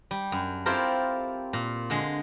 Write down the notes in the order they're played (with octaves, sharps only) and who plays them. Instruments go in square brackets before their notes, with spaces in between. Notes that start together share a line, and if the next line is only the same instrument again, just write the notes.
[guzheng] G3
F#2
C4 E4 F4 G4 A4 A#4
A#2
D3 G#3